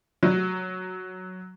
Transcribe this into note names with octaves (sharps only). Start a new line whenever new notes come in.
F#3